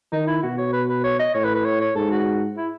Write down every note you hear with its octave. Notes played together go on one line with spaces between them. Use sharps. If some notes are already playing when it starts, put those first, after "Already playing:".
D#3 D#4
E4
B2 F#4
C#5
B4
B4
C#5
D#5
A2 C#5
B4
B4
C#5
C#5
G#2 A4
F#4
E4